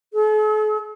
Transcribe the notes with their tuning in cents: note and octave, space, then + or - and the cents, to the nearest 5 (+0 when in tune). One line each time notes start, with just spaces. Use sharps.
A4 -45